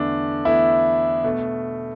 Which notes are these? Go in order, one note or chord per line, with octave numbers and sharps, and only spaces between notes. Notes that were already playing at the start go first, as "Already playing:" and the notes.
Already playing: E2 D3 A3 D4
E2 D3 A3 E4
B2 A3